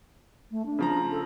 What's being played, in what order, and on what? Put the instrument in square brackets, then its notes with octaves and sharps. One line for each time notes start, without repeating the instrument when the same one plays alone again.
[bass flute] A3
D4
[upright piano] C#3 F3 A#5
[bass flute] A4